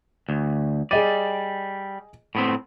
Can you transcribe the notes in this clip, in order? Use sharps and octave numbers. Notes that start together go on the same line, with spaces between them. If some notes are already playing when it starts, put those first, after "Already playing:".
D2
G3 G#4 D5 D#5 D#7
A2 B3 C4